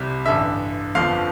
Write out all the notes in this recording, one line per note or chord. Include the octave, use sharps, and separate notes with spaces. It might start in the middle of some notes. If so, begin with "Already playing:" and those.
Already playing: C2 C3 G3
A1 G2 D3 E5
G1 F2 D3 F3 F5